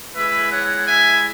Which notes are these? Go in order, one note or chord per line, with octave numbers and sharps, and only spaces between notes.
G#3 E4 B4 E5
C#5 F#5
E5 G#5